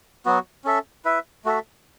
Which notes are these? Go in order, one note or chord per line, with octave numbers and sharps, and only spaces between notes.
F#3 B3 F#4
C#4 A4 E5
E4 B4 E5
A3 F#4 A4 E5